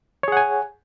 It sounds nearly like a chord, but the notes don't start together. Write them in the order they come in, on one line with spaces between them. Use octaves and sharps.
C#5 G#4 F#5 G#5